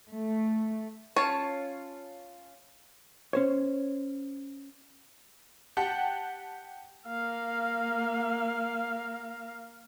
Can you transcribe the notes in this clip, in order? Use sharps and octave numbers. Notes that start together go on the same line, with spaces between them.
A3
C#4 F4 C#5 A5
C#4 C5 C#5
G4 F#5 G5 A5
A#3 F5